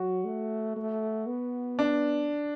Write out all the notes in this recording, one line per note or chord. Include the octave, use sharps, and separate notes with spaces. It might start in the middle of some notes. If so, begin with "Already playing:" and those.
Already playing: F#3 F#4
A3
A3
B3
D4